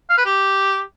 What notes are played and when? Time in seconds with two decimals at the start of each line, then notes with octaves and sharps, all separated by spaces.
0.10 F5
0.18 B4
0.26 G4